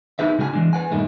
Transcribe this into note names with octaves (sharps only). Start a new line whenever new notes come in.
D#4 E4 G#4 B4 E5
C#3 G#3 F#4 G#4 F5 G#5
E3 G#3 D4
B4 F#5 G#5
G2 A#2 D#3 G#3 A3